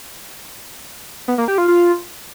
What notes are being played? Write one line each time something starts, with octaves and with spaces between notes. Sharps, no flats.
B3
A#3
G4
F4
F4